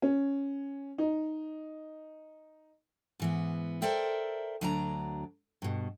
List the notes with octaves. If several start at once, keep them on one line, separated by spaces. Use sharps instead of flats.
C#4
D#4
G#2 E3 B3
A4 A#4 C5 D5 E5 G5
D2 F#3 D4 D5 G#5 A#5
G2 B2